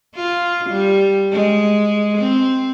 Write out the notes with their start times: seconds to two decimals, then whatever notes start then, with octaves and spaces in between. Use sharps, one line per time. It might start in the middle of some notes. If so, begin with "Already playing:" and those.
0.15 F4
0.70 G3
1.32 G#3
2.18 C4